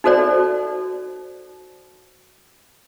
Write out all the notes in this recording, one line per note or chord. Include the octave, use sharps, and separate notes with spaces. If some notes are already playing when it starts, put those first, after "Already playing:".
D#4 F#4 A4 C5 D5